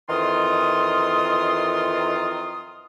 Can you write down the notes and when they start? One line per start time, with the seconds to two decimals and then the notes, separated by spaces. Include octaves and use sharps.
0.09 F2 D#3 E3 F4 C6 D#6